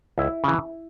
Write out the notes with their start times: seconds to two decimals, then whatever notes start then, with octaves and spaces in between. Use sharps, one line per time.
0.18 C#2 E4
0.44 C#3 E3